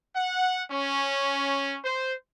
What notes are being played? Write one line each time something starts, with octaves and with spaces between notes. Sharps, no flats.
F#5
C#4
C5